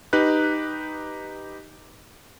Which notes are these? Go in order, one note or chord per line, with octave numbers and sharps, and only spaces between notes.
D#4 G4 B4 F#6